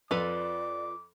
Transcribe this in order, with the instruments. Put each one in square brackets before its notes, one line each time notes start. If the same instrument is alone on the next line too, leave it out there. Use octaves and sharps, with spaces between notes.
[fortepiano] F2 [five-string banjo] F4 A4 B4 [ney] D5 [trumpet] D6